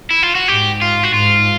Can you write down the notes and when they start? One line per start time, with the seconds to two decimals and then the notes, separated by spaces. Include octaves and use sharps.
0.11 E4
0.22 F4
0.35 F#4
0.48 G#2 G4
0.81 F4
1.03 F#4
1.14 G#2 F4